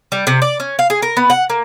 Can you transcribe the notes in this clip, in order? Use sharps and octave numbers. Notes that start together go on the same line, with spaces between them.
G3
C3
D5
C#4
F5
G#4
A#4
B3
F#5
A#3